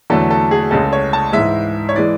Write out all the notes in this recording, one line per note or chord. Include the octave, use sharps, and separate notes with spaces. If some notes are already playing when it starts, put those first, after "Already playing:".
E2 D3 F#3 A3 A4
A4
G#4
C#2 C#3 G#3 A4
C#5
A5
G#2 E3 G#3 E5
C#5
E3 G#3 D5